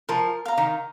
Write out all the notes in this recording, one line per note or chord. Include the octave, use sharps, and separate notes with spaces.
F3 A#4
F5 A#5
D#3